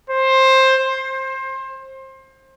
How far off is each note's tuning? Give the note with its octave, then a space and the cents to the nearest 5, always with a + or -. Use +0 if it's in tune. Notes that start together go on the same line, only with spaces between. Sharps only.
C5 +15
C5 +25